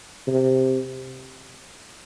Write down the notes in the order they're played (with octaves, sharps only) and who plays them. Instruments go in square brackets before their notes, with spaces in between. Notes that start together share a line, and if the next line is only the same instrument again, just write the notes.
[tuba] C3